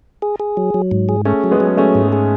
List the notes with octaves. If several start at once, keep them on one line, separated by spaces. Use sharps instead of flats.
G#4
G#4
F#3
F#3
G#2
G#4
A3 C#4 G#4
F#3
G#3 B3
F#3
A3 C#4 G#4
G#2
G#4